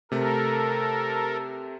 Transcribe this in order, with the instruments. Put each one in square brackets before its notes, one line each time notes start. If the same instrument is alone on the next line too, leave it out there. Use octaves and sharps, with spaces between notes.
[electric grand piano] C3 A3 [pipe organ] A4 A#4